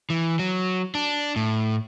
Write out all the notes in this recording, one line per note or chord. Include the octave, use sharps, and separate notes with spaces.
E3
F#3
D4
A2